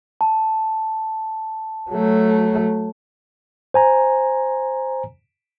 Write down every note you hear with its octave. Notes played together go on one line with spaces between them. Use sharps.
A5
F#3 A3
C5 G#5 A#5